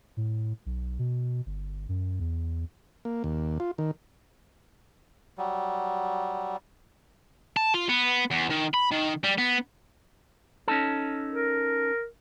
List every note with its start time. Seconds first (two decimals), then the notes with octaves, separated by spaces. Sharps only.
0.17 A2
0.66 B1
0.99 B2
1.46 G1
1.89 F#2
2.20 E2
3.05 A#3
3.24 D#2
3.60 F4
3.78 D#3
5.38 F#3 G3
7.56 A5
7.74 F4
7.89 B3
8.31 E2
8.50 D#3
8.74 B5
8.92 D#3
9.24 G3
9.38 B3
10.68 C#4 D#4 A4
11.33 A#4